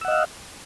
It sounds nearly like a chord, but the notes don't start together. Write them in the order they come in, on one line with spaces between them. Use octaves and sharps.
E6 F#5 D#5 F5